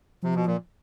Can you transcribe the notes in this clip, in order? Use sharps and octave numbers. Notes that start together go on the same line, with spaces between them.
C3 F3
B2
A#2